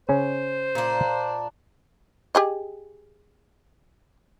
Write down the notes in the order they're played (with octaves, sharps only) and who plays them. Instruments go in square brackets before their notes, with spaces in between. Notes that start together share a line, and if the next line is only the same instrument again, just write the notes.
[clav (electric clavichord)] C#3 C#4 [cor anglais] C5
[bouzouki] A#2 D4
[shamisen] G4 G#4 D#5